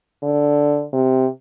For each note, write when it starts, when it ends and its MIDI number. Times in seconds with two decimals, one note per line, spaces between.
0.23 0.84 50
0.93 1.27 48